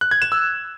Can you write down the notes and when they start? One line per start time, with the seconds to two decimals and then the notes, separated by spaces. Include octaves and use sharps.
0.01 F#6
0.11 G#6
0.22 E7
0.32 E6